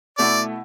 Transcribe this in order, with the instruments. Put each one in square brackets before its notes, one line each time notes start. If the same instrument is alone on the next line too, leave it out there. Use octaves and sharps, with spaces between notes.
[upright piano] B2 A3 E4 [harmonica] D5